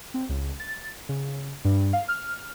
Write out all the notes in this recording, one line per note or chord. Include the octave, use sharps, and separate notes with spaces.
C4
C#2
A6
C#3
G2
F5
F6